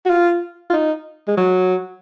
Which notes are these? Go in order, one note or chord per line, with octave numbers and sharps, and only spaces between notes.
F#4
F4
F4
D#4
G#3
F#3